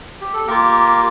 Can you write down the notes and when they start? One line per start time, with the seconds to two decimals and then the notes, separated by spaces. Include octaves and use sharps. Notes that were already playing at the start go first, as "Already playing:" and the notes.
0.21 G4
0.33 A4
0.47 A#3 F4 G4 A#4